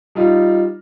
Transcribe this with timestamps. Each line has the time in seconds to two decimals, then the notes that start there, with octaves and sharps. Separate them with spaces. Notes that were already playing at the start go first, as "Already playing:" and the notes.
0.15 G3 D#4 F4